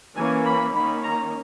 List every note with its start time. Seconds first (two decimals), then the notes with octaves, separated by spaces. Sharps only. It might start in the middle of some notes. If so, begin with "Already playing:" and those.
0.15 E3 A#3 C#4 G#5
0.45 B5
0.74 D#3 A#3 C#4 B5
1.03 A#5